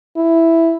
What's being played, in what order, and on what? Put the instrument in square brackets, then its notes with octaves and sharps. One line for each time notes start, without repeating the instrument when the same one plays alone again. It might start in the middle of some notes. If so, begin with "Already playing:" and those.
[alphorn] E4